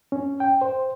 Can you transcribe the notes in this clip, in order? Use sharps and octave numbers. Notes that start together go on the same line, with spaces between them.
C#4
G5
C5